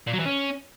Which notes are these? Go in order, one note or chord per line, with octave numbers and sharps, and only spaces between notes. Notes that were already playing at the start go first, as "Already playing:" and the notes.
A#2
F#3
E3
C#4